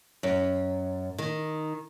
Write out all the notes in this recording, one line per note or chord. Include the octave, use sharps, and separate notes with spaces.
F#2
D#3